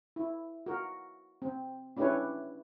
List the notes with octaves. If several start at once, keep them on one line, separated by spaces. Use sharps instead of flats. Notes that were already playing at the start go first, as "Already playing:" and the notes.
E4
F#4 A#4
C4
C#4 D4 E4 G4 B4 C#5